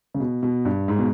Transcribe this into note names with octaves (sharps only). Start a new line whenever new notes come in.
C#3
B2
B2
G2
G#2
B2